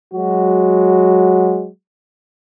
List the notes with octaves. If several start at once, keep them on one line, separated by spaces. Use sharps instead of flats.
F#3 G#3 F#4